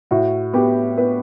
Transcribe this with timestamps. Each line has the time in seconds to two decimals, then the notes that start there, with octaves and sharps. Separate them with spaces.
0.11 A2 F#4
0.53 B3 G4
0.97 B3 B4